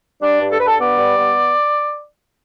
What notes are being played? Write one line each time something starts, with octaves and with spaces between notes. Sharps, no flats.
G3 D4
G2
A4
G2 B4
A4
B3 D5
G3
B3